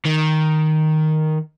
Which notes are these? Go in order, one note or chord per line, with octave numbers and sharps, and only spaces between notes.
D#3